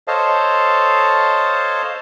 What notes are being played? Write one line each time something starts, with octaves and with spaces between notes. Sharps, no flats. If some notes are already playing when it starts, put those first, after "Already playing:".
A4 C5 C#5 D#5 F5 A5